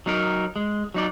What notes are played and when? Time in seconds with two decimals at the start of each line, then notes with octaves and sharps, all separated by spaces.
0.06 F#3 D#4 A#4
0.56 G#3
0.94 F#3 D#4 D5